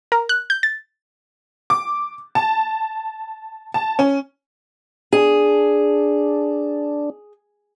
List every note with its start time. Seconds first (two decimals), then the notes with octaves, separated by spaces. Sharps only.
0.12 A#4
0.29 F#6
0.50 G6
0.63 A6
1.70 D6
2.35 A5
3.74 A5
3.99 C#4
5.13 D4 G#4